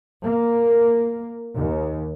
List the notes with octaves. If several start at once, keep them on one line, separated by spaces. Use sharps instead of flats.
A#3
D#2